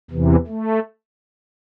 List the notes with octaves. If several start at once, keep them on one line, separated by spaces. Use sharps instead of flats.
E2 C3 E3
A3